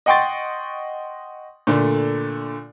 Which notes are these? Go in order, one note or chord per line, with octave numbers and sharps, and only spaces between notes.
D#5 F#5 G5 C6 C#6 A6
A#2 D3 A3